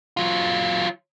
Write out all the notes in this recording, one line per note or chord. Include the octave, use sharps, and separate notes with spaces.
F#3 F4